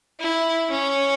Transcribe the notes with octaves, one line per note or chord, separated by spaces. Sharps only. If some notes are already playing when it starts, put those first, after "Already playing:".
E4
C#4